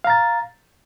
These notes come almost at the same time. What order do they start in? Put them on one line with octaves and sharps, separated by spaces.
F5 A#5 A6